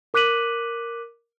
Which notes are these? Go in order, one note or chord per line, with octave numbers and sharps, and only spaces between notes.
A#4 D6 F#6 B6 D#7 F#7